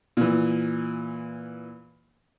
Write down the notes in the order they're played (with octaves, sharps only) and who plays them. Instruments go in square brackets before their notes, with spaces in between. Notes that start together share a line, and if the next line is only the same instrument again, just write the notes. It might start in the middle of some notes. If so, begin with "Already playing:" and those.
[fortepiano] A#2 E3